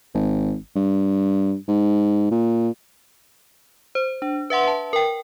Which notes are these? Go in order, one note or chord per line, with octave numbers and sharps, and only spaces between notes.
G#1
G2
G#2
A#2
C5
D4
B4 E5 F#5 C6
A5
A#4 G5